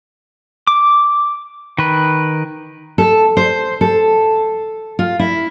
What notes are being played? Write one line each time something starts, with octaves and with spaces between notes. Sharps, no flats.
D6
D#3 B4
A4
C5
A4
F4
E4